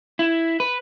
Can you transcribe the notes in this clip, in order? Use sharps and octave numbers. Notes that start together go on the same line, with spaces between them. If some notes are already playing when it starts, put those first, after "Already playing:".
E4
B4